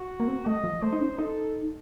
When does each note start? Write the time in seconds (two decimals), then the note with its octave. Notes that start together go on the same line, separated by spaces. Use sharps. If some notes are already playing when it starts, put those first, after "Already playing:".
Already playing: F#4
0.20 A#3
0.28 C4
0.46 A3 D#5
0.64 F3
0.82 A3 C5
0.93 D#4
1.01 C#4
1.18 D#4 A4